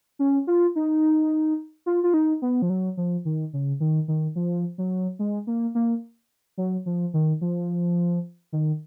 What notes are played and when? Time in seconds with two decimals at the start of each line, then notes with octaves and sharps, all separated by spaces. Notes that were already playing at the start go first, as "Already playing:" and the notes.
0.19 C#4
0.47 F4
0.76 D#4
1.86 F4
2.04 F4
2.14 D#4
2.42 B3
2.62 F3
2.70 F#3
2.97 F3
3.25 D#3
3.53 C#3
3.80 D#3
4.08 D#3
4.36 F3
4.78 F#3
5.19 G#3
5.47 A#3
5.75 A#3
6.58 F#3
6.86 F3
7.14 D#3
7.41 F3
8.53 D#3